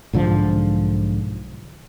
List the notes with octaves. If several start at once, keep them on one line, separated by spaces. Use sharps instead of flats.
B1 G#2 D3 F3